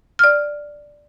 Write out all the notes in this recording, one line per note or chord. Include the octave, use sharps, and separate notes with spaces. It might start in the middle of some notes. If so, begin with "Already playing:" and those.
D5 F6